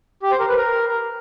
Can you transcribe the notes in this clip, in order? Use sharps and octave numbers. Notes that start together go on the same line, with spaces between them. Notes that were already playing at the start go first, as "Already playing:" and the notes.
G4
C5
A#4
B4
A#4